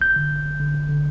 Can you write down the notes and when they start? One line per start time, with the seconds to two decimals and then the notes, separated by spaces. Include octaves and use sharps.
0.01 G1 G6
0.16 D3
0.31 G1
0.45 G1
0.60 D3
0.75 G1
0.89 D3